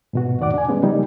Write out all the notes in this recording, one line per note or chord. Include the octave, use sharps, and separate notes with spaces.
G#2 B2 F#4
F2 A2 D#3 D5 F#5 D6
D4 G#5
G3 G#3 B3 C#4
C#3 F3 G3 A#3 D#4